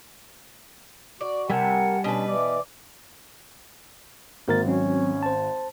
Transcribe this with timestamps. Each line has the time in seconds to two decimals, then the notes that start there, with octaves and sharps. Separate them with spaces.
1.21 F#4 D5
1.50 C3 G3 A#4 F#5 G#5 A5
2.04 B2 C#4 D4 B4
2.29 E3 D5 D6
4.48 G#1 A#3 A#4 A6
4.66 F#3 C4 C#4
5.23 C5 A5